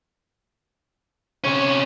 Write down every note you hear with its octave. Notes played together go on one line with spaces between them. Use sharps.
C3 C#4 C#5